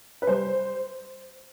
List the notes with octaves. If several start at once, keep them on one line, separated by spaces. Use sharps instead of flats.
B4
G3 C5